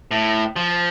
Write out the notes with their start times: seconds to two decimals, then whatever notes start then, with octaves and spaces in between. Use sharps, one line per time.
0.11 A2
0.56 F3